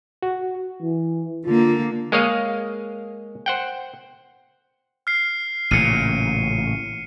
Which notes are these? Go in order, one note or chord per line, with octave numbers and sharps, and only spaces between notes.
F#4
E3
D3 A#3 F4
G#3 A#3 G#4 C#5 D#5 F5
C5 F#5 G5
F6 C7
A1 A#2 C#3 C#7 D#7